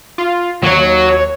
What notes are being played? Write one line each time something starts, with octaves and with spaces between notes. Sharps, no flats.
F4
D#2 F#3 C#5